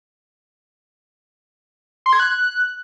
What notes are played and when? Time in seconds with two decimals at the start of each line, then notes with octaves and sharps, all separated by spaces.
2.06 C6
2.13 G#6
2.20 F#6